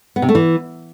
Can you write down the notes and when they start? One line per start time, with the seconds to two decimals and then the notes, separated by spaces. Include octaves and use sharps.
0.16 B3
0.22 C3
0.29 A3
0.35 E3